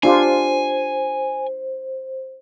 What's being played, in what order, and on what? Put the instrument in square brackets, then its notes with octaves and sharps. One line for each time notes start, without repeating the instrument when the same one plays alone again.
[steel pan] D4 F4 G4 [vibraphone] C5 [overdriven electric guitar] G#5